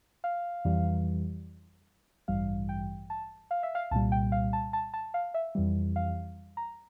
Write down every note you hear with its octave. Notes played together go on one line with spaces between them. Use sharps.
F5
F2 E3 G3
A1 G2 E3 G3 F5
G5
A5
F5
E5
F5
C2 A#2 G3 A5
G5
F5
A5
A5
A5
F5
E5
F2 E3 G3
F5
A#5